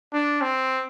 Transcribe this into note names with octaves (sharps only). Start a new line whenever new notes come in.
D4
C4